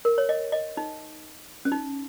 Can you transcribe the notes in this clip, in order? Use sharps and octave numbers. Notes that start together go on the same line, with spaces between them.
A#4
C#5
D#5
D#5
D#4
C#4
D#4